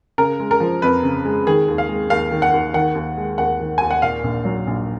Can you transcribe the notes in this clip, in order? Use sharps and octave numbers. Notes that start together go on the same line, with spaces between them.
C#3 A#4
G#3
A#4
F3
F2 B4
C#3
G#3
D#3 G#4
D#2
F5
G#3
D#2 F5
D#3
F#5
D#2
D#3 F#5
D#2
G#3
D#2 F#5
D#3
D#2 G#5
F#5
A#2 F5
A#1
F#3
A#1